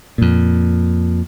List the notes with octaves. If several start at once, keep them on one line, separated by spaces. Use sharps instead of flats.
F2 A#2